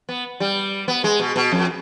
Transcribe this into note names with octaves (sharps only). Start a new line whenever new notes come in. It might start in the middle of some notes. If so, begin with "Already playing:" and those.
B3
G3
B3
G#3
B2
B2
F2